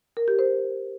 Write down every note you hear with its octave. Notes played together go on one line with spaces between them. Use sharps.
A#4
G4
C5